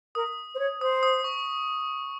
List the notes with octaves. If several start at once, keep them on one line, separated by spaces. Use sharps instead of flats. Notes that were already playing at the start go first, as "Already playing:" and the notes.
A#4 D#6
C5
C#5
C5 D#6
D#6
C#6